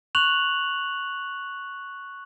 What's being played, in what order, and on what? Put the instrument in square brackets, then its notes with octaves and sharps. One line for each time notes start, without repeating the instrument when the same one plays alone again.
[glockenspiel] C#6 F#6 F7 F#7